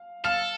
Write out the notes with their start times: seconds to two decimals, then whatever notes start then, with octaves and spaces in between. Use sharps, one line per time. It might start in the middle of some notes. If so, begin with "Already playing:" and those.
Already playing: F5
0.25 A4 F5 F6